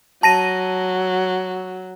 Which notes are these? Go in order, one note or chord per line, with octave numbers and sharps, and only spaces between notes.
F#3 A5 A#6 D#7